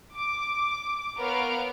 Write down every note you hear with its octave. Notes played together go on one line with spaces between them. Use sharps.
D6
B3 A#4 C#5 F5 F6 D7